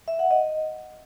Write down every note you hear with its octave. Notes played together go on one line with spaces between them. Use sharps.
E5
F#5
D#5